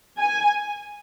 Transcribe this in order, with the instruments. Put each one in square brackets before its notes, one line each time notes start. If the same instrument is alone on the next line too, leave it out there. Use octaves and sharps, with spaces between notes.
[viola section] G#5